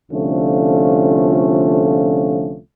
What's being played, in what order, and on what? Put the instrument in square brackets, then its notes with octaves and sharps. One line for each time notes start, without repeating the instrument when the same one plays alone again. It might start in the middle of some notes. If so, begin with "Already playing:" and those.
[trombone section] C2 D3 F3 A3 C#4 F4